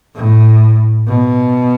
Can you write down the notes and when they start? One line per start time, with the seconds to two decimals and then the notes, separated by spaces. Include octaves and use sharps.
0.15 A2
1.07 B2